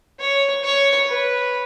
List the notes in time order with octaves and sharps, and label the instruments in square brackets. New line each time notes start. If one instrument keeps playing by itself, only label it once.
[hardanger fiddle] C#5
C#5
B4